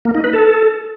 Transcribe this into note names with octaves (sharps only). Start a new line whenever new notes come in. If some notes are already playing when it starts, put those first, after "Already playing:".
A#3
D#4
B4
A4